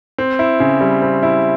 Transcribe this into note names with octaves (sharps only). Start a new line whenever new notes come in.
C4
E4
C#3
G3
C4
E4